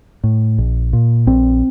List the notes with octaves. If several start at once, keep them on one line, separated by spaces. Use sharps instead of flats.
A2
A#1
A#2
A#1 C4